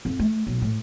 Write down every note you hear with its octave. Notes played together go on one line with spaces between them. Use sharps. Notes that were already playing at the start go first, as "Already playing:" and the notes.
F2
A3
B1
A2